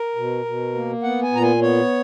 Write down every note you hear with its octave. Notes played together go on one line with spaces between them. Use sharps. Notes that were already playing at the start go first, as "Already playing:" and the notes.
Already playing: A#4
B2
B2
A#3
B3 F#5
G#5
A#2 A#5
G#5
B3 C#5